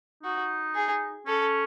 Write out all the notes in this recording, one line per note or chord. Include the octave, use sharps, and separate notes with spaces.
D#4 F#4
G#4
C#4 A4